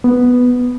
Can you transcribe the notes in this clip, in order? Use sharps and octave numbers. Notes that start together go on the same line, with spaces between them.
B3